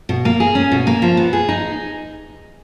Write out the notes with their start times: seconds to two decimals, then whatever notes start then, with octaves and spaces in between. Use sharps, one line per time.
0.09 B2
0.25 A#3
0.40 G#4
0.55 C#4
0.72 B2
0.87 A#3
1.02 F3
1.17 B3
1.33 G#4
1.49 D#4